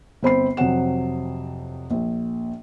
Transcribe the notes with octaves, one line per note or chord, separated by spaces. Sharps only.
G1 C4 B5 C7
F2 C3 F#3 C4 F#5 E7
A#1